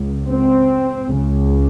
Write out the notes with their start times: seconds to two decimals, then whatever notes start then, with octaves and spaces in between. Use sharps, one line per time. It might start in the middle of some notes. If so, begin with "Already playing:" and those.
Already playing: C#2
0.27 C4
1.11 C#2 C#3